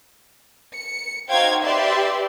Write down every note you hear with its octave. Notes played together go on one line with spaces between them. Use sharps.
C#7
D#4 F#4 C5 F5 G5 G#6
G4 B4 D5 E5 C6